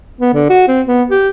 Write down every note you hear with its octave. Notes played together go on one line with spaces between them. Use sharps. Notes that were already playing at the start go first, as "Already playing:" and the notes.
B3
D3
F#4
C4
B3
G4